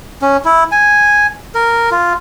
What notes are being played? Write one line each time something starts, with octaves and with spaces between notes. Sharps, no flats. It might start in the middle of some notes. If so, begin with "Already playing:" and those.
C#4
E4
G#5
A#4
F4